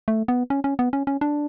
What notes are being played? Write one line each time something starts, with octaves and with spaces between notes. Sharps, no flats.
A3
B3
C#4
C#4
B3
C#4
C#4
D4